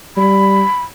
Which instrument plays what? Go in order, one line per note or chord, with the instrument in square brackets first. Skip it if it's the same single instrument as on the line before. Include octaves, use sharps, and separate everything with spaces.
[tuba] G3 [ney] B5